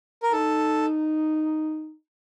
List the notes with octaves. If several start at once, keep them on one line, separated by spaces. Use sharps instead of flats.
A#4
D#4 A4